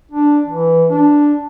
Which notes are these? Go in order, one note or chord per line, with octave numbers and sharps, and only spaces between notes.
D4
E3
D4